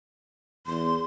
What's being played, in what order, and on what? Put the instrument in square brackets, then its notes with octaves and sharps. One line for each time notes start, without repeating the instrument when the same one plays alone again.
[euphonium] E2 [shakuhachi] C6